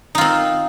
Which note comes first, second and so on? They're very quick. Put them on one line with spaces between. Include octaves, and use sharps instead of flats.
D#4 F4 C4